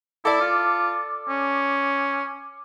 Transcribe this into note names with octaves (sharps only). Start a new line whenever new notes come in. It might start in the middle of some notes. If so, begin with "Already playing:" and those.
E4 A4 D5 D6
F4
C#4